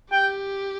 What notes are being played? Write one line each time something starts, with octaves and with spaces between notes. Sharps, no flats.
G4 G5